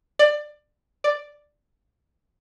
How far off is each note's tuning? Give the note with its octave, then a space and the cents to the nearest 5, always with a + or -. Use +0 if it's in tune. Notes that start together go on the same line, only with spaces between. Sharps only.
D5 +20
D5 +5